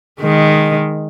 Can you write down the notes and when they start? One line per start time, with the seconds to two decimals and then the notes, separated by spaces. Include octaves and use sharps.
0.20 D#3 G#3